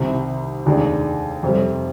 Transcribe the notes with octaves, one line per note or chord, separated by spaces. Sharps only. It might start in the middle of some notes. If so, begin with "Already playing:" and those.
Already playing: C2 C3 D#3
F1 D#2 D#3 G#3 D4
F2 C3 G3